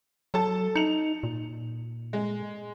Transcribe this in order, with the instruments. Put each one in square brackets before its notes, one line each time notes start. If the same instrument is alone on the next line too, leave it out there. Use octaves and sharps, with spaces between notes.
[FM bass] F#3 [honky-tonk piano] A4 A5
[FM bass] D#4 [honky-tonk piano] C#7 F7
[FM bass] A#2
[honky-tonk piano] G#3